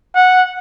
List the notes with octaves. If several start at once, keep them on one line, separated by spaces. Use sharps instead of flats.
F#5